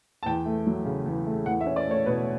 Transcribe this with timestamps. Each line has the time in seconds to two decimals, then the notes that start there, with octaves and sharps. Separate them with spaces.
0.23 A5
0.26 E2 G5
0.46 A3
0.67 F#3
0.86 C#3
1.06 E2
1.26 A3
1.46 E2 F#5
1.61 E5
1.67 C#4
1.76 D5
1.87 A3 C#5
2.06 B2 B4